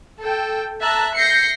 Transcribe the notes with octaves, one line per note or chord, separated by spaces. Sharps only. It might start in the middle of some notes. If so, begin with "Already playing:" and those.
A4 G5
E5 A5 A#5 F#6
G6 A#6 C7 C#7